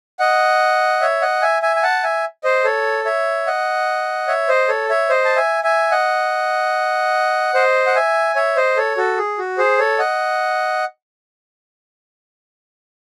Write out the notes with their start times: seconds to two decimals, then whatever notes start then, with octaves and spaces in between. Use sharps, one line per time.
0.20 D#5 F#5
1.01 C#5 E5
1.22 D#5 F#5
1.42 E5 G#5
1.62 E5 G#5
1.76 G#5
1.83 F#5 A5
2.03 E5 G#5
2.44 C5 D#5
2.64 A4 C#5
3.05 C#5 E5
3.47 D#5 F#5
4.28 C#5 E5
4.48 C5 D#5
4.68 A4 C#5
4.90 C#5 E5
5.10 C5 D#5
5.25 A5
5.36 E5 G#5
5.63 E5 G#5
5.91 D#5 F#5
7.54 C5 D#5
7.87 F#5
7.95 E5 G#5
8.36 C#5 E5
8.57 C5 D#5
8.77 A4 C#5
8.97 F#4 A4
9.18 G#4
9.38 F#4
9.58 G#4 C5
9.79 A4 C#5
9.99 D#5 F#5